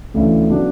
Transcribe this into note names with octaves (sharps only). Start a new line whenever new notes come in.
D2 C#3 E3 A3 E4
C#3 F#3 B3 D4